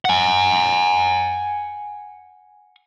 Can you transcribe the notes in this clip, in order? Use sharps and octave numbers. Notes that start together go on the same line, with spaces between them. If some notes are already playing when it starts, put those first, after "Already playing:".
F#5 G#5